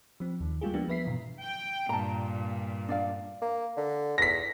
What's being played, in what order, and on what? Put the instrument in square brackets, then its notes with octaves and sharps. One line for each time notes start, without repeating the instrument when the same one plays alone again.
[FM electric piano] F3 C4
D#2 D#3
G3 G#3 A#3 F4 G4 G#4
F3 G#3 A#3 B3 D4 G4
F3 B3 B4 E5 B6 C7
G#2 B2 E3
[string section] G5
[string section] G2 A#2 [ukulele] A5 A#5
[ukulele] D4 D5 F5
[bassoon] A#3
D3
[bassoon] E2 [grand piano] A#6 B6